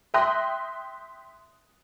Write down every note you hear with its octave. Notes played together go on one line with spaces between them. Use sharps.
E5 G5 C6 D#6 F#6 A#6